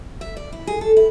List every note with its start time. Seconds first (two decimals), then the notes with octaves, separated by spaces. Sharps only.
0.21 E5
0.37 D5
0.52 E4
0.67 G#4
0.81 A4
0.97 E4